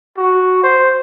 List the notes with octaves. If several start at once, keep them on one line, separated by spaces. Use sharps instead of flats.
F#4
C5